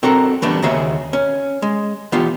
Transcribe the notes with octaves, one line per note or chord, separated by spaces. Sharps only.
C4 F#4 A4 A#4
E3 G3 A3 B3 D4
D#2 C#3 F#4 G#4 E5
C#4
G#3
E3 B3 F4 G4